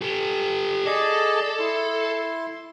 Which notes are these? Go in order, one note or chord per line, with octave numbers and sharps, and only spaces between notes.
G4 A4
G#4 A4 D5 D#5
E4 C6